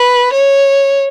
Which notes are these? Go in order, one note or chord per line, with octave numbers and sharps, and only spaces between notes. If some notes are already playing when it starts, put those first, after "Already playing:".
Already playing: B4
C#5